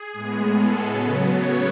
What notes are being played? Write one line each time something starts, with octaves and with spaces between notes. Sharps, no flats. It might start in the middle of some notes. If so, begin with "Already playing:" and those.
Already playing: G#4
A2 G#3 B3
A4
C#3 F#3 B3
C#5